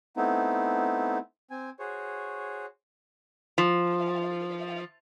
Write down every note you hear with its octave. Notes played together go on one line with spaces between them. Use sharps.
A3 B3 C4 D#4 E4
C4 G#5
F#4 G#4 C5 C#5
F3